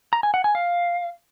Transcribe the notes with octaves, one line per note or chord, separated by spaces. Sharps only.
A#5
G#5
F#5
G#5
F5